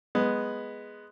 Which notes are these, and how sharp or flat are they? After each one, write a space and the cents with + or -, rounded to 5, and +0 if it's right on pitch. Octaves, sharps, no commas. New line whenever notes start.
G#3 +0 B3 +0